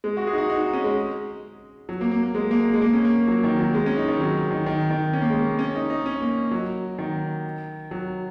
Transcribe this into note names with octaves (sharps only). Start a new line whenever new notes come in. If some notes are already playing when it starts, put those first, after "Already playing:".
G#3
F#4
G#4
D#4
F#4
D#4
D#4
C#4
G#3
F#3
A#3
A#3
A#3
G#3
A#3
G#3
A#3
C#4
A#3
F#3
D#3
F#3
G#3
C#4
D#4
D#3
F#3
D#3
D#3
D#3
C#4
A#3
G#3
A#3
C#4
D#4
D#4
C#4
A#3
F#3
D#3
F#3